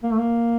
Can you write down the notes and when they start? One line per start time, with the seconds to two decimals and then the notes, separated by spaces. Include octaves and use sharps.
0.03 A#3
0.11 A3
0.18 A#3